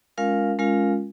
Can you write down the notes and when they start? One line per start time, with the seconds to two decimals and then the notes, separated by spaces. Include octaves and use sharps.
0.18 G#3 C#4 F4 A#4 F5
0.59 G#3 C#4 F4 A#4 F5